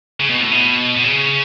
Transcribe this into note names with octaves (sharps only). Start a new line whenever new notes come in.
C#3
B2
A2
B2
B2
C#3